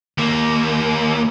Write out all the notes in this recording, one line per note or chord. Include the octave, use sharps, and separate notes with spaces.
D#2 A#3